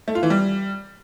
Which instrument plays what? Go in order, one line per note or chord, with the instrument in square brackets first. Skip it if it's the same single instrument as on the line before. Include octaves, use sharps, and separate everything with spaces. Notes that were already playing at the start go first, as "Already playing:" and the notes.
[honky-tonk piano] A3
F4
E3
G3